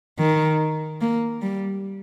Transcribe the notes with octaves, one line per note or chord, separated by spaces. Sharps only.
D#3
A#3
G3